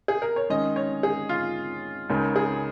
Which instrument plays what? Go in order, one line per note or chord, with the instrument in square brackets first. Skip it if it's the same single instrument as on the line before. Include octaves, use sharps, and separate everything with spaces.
[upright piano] G#4
A#4
C#5
[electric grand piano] D#3 G#3 C#4 [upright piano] D#5
[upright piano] C#5
G#4
F4
[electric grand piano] C#2 C#3 G#3 D#4 A#4
[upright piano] G#4